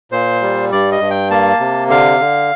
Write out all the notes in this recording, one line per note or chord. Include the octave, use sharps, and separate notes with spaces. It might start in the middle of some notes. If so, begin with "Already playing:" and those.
A#2 C5
G3
G2 D5
D#5
G2
G5
A#3 A5
C3
D3 F5
D3